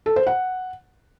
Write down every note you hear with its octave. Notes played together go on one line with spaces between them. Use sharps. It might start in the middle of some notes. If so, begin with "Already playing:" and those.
A4
C5
F#5